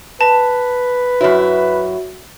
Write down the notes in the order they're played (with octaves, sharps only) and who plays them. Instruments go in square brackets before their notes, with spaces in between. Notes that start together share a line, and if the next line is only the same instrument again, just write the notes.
[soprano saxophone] B4 [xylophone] A5
[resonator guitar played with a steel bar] F#2 E4 [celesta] F#4 C#5 E5